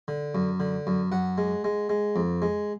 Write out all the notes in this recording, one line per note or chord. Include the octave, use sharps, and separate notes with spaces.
D3
F#2
D3
F#2
F#2 F#5
G#3
G#3
G#3
F2
G#3